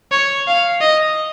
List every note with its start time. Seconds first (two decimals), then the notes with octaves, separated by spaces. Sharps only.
0.12 C#5
0.47 F5
0.81 D#5